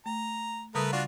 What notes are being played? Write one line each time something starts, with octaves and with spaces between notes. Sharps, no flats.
A3 A#5
C#3 G3 A3 A#4 B4 D#6
D4 F4 F#4